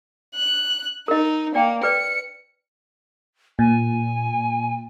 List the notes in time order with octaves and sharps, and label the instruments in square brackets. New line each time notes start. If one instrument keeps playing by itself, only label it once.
[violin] F#6
[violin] D#4 [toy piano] A#4 D#5
[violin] A#3 [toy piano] D5 G5
[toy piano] B4 D5 [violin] C#7
[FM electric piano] A#2 [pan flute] G#5